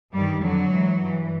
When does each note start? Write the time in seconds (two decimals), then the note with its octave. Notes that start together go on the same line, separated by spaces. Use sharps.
0.13 G2 D#3 G3
0.43 F2 D3 F#3
0.72 G#2 E3
1.01 G2 E3